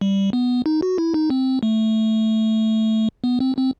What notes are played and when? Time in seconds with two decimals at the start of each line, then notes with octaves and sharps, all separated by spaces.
0.01 G3
0.33 B3
0.66 D#4
0.82 F#4
0.98 E4
1.14 D#4
1.30 C4
1.63 A3
3.24 B3
3.40 C4
3.57 C4